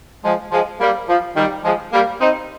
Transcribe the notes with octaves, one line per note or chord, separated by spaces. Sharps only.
F3 G#3
F3 G#3
G3 A#3
F3
D#3 G3
F3 G#3
G3 A#3
C4 D#4